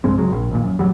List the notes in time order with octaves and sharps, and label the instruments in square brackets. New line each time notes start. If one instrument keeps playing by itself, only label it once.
[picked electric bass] C2 G2 G#3 C4
C#2 F#3 G#3
A#1
A#1 D#2 A#2
F#2
A1 C3 F#3 G3